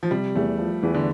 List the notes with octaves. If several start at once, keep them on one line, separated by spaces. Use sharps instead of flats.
F3
C3 G3
E2 A3
F3
E2 E3
D3